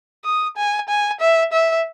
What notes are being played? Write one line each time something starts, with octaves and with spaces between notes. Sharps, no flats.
D#6
G#5
G#5
E5
E5